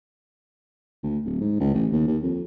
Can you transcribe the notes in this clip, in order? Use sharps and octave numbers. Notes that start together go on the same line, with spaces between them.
D2
D1
G#2
C#2
A1
D#2
D#2
F2